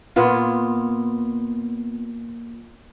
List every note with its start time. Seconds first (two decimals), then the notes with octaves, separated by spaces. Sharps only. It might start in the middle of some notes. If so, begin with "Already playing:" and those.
0.16 A#2 B3 F4